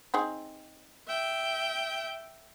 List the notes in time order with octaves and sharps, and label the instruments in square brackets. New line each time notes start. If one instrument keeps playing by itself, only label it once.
[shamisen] C4 D#4 G#4
[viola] E5 G5